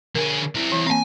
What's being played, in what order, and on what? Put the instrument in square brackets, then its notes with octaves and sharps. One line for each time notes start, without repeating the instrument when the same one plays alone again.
[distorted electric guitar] D3 G#4 [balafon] A#4
[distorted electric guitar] C4 E4
[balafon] E3
[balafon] A#3 C4 [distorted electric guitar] F5 G#5